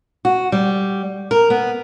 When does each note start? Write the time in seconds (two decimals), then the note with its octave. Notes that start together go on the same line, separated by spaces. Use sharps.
0.25 F#4
0.52 G3
1.31 A#4
1.50 B3